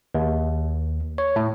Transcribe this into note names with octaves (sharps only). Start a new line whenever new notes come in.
D#2
C#5
A2